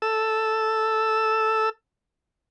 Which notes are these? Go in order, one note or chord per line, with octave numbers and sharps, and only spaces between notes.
A4 E6